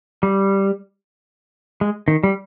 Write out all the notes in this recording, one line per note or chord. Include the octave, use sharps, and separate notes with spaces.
G3
G#3
D#3
G3